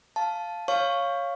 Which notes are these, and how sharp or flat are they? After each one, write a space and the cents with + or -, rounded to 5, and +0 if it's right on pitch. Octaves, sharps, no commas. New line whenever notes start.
F5 +0 A5 -10
C#5 +0 F5 +0 C#6 +0